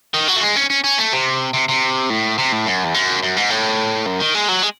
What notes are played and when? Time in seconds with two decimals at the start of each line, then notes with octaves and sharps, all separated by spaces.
0.14 D#3
0.28 F#3
0.36 A3
0.41 G#3
0.56 C#4
0.70 C#4
0.84 C#4
0.98 A3
1.12 C3
1.54 C3
1.69 C3
2.10 A2
2.38 C3
2.52 A2
2.66 F#2
2.84 E2
2.94 F#2
3.23 F#2
3.37 G#2
3.50 A2
4.06 F#2
4.20 D#3
4.34 G#3
4.49 F#3
4.63 G#3